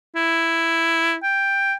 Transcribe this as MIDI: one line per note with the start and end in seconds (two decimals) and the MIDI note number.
0.15 1.16 64
1.23 1.74 79